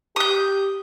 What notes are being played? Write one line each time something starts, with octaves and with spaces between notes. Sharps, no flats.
G4 D#6 G6